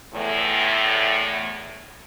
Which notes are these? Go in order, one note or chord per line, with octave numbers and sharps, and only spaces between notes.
E2 A2